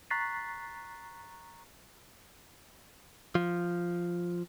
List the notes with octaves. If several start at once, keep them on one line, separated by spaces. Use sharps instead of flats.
A#5 C#6 F#6 A6 B6 C7
F3